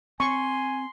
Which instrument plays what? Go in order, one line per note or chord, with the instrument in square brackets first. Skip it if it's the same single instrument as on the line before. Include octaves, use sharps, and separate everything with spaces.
[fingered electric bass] C4 [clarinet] G#5 [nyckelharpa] C6 [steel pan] C#6